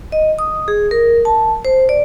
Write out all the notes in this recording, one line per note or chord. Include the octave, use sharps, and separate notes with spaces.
D#5
D#6
G#4
A#4
A5
C5
D5